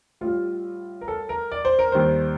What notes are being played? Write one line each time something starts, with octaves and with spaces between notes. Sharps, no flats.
A2 G3 F4
A#4
A4
A#4
D5
C5
A#4
D#2 D#3 G3 C5